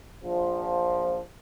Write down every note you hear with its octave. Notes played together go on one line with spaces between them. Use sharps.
A#1 F3